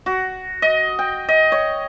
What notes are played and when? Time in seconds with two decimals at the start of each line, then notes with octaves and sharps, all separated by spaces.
0.06 F#4
0.62 D#5
0.99 G5
1.28 D#5
1.52 C#5